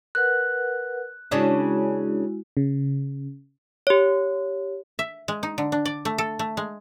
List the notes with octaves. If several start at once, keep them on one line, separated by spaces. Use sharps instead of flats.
A#4 B4 F#5 F#6
C#3 G#3 C#4 D4 E4 F#4
C#3
G4 C#5
E5
G#3
D#4
D3
D4
D5
A3
A4
A3
G#3